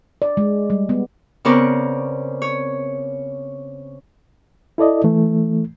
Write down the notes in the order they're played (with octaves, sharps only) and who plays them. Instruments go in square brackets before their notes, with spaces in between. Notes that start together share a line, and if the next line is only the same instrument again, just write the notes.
[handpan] D5
G#3
G3
B3
[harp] C#3 B3 C4 A#4 D5 C#6
C#5
[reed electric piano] E4 A4 D5 D#5
E3 A3